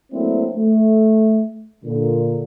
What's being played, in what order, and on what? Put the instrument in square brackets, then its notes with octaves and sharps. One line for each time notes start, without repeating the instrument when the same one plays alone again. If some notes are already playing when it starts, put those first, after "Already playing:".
[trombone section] F#3 A3 A#3 C4 D4 E4
A3
A#2 D3